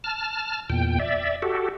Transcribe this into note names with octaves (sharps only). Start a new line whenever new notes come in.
A5 F6
E2 A#2 G5
D5 E5
F#4 G4 A4